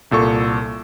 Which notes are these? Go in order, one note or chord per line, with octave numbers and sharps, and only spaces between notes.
C2 A#2 A4 C#6